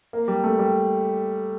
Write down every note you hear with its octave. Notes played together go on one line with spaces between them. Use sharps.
A#3
G3
A3
G3